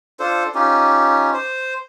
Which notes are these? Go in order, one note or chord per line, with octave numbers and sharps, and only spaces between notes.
D4 F4 A4 C5
C#4 D#4 F4 G4
C5